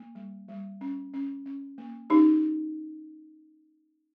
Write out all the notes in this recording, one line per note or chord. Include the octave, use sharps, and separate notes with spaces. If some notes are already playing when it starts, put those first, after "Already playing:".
Already playing: A#3
G3
G3
C#4
C#4
C#4
A#3
C#4 D#4 G4